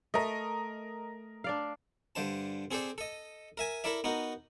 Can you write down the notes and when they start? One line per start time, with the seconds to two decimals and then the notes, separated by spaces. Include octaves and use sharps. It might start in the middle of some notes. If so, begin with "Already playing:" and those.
0.14 A3 A#4 D#5
1.44 D4 D5 F5
2.15 G2 D3 C5 A5
2.71 C4 G#4 A4 C5 D5
2.98 A4 D#5
3.57 A#4 E5 G#5
3.84 E4 A4 A#4 D5 E5
4.04 B3 D#4 F#4 A#4